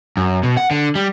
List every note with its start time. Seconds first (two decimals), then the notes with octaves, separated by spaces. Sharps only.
0.17 F#2
0.43 B2
0.57 F#5
0.71 D3
0.95 G3